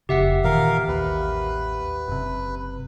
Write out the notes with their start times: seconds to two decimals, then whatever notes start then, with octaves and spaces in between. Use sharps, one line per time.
0.09 F1 C#3 G4 E5 F#5
0.44 A#2 D#3 E3 A#4 F5
0.88 A1 D#2 B4
2.08 F#1 C3